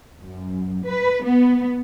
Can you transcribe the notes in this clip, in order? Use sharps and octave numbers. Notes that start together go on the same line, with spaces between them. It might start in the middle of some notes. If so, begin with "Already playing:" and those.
F#2
B4
B3